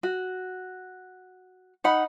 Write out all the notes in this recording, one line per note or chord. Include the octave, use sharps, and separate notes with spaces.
F#4
D#4 F#5 B5